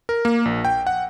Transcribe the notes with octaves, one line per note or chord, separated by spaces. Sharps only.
A#4
A#3
A#1
G5
F#5